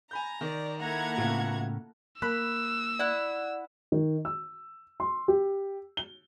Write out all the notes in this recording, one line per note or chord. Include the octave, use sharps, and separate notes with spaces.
G#5 A#5 B5 G6
D#3 D5
A#3 E4 A4 F#5 A#5 G#6
A2 C#3 B3 F4 F#4
A#3 B5 E6 F#6
E4 D5 F#5
D#3
E6
C6
G4
G7